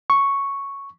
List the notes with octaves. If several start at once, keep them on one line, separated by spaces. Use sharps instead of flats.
C#6